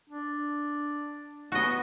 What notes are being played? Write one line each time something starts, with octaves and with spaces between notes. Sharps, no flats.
D4
B3 F#4 D#5